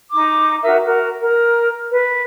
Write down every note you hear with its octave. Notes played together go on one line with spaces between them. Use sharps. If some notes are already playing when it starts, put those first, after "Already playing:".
D#4 D6
D#4 F#4 A#4 E5
F#4 A#4
A#4
B4